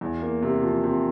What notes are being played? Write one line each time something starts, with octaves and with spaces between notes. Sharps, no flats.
E2
A#3
C3
F3
C3